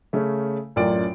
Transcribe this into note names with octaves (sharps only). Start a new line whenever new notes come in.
C#3 A3 C#4
A1 F#2 F4 A#4 D5 D7